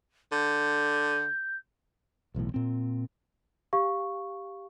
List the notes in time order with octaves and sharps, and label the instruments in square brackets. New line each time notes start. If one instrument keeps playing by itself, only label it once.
[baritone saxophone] D3 [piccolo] G6
[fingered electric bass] E1 B1 E2 A2
A#2 C4
[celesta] G4 F5 C#6